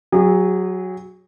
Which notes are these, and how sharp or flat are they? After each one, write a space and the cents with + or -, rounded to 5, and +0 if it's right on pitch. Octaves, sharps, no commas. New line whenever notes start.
F#3 +0 G#4 -35